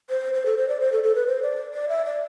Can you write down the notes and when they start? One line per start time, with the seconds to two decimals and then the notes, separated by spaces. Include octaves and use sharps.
0.10 C5
0.34 C5
0.46 A4
0.57 C5
0.69 D5
0.80 C5
0.92 A4
1.04 A4
1.15 B4
1.27 C5
1.42 D5
1.74 D5
1.89 E5
2.05 D5